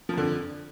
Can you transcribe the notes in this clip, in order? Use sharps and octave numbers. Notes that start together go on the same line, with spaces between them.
F2 D3 F3